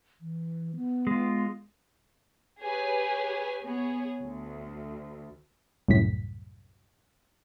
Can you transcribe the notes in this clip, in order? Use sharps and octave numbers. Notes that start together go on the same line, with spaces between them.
E3
B3
G#3 F4
G4 G#4 B4 C#5 G#5
B3 G#4 C#5
D2
C2 F#2 A2 B6